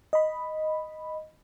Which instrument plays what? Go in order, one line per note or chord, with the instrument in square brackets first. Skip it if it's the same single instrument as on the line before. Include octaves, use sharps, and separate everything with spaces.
[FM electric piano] D#5 B5